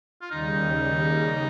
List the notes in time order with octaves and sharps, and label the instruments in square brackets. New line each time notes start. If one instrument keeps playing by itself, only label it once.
[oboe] F4
[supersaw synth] D#2 C#3 G3 [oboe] D#4